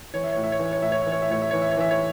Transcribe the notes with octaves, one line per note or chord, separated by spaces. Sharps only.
E3 C#5
E5
A2 C#5
E5
C#5
E3 E5
C#5
A2 E5
C#5
E3 E5
C#5
E5
A2 C#5
E5
E3 C#5
E5
C#5
E3 E5
C#5